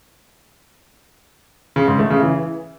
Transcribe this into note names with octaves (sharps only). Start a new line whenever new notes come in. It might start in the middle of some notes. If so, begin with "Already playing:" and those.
C#3
G#2
A3
C#3
E3